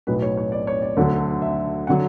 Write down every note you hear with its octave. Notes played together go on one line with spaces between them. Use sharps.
B1 A2 F#3 B4
C#5
C#5
D5
C#5
D5
D2 D3 F#3
E5
D3 F#3 F#5